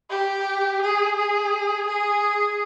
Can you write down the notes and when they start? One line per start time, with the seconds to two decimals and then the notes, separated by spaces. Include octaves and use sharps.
0.10 G4
0.82 G#4
1.17 G#4
1.88 G#4